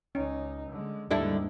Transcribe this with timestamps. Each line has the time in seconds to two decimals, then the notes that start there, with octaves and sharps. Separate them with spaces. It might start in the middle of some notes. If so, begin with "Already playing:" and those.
0.15 C#2 C#4 D#4
0.69 D3 G#3
1.11 D#2 G#2 D3 G3 D4 E4 A4